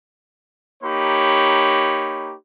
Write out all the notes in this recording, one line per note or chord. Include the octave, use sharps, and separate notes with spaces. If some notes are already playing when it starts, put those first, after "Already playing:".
A#3 D#4 G4 C#5 B5